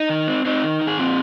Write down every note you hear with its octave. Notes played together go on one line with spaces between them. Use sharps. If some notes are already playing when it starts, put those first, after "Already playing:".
Already playing: D#4
D#3
C4
C4 D#4
D#3
D#3
G#4
A#2 C4 F4